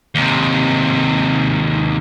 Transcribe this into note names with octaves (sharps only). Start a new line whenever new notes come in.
D#2 C3